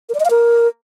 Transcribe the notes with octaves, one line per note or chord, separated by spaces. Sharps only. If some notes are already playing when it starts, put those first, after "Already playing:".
A#4
D5
D#5
F5
A#4